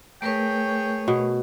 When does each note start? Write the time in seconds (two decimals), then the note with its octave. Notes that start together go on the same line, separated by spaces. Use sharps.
0.22 A3 G#4 A#4 B4 C#5 G5
1.08 B2